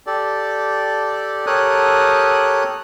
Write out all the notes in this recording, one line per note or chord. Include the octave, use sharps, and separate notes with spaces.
G4 A4 D5
G4 A4 A#4 C#5 D#6 F#6